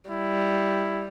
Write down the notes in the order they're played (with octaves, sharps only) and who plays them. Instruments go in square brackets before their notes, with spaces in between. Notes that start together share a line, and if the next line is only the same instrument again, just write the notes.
[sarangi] G3 [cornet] E4